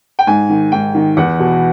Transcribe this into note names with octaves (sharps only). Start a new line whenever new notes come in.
G5
G#2 G#5
D#3
G#2 G5
D#3
E2 F#5
B2